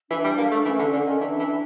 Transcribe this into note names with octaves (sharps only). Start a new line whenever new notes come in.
E3 D4
G3
A#3
A3
E3 C#4
D3
C#4
D3
D#3 C#4
E3 D4
E3